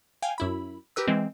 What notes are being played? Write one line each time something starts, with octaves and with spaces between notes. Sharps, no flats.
F5 G5 G#5
F#2 E4 B5
G4 A#4 B4 E6
E3 G#3 C4